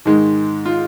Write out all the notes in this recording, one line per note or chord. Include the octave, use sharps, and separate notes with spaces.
G#2 D#3 G#3
F4